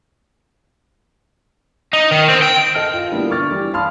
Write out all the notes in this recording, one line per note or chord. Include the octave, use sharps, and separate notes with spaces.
D#4
D#3
C4
G5
A4 D#5 A5 F6
F4
D3 G3 A#3 B3 E4
C#6 D6 F6 A6
E3 G3
F5 A5 B5 C6 D#6 F6